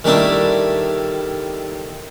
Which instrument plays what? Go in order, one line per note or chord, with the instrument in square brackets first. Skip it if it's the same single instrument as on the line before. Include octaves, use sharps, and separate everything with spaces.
[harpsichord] D#3 G3 A3 D4 E4